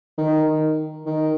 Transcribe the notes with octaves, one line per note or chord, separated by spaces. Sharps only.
D#3
D#3